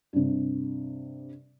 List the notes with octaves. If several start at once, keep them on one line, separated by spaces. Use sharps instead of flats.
G2 C3